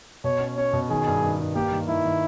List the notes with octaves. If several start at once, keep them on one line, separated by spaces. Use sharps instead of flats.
B2 C#5
C#4
C#4 C#5
B2
D#3 G#4
G2
D#3
G2
A#3 G4
D#3
D#3 E4
D#3